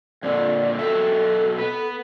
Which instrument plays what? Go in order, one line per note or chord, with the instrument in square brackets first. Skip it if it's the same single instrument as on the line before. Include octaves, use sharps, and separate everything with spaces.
[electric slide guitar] F2 A#2 D3 [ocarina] D5
[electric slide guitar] B2 F#3 E5 [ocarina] A4
[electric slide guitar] B3 B4